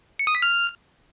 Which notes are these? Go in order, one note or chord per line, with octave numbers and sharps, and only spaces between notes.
C#7
D#6
B6
F6